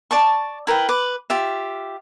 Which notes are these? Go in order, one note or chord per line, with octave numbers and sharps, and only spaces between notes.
D5 A5 C#6
E4 A#4 B4 G5
B4 D6
F4 G4 E5